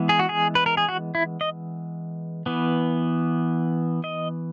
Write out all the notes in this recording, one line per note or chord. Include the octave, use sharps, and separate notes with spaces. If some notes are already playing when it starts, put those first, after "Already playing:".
Already playing: E3 G#3 B3
G#4
F#4
G#4
B4
A#4
G#4
F#4
E4
D#5
E3 B3
D#5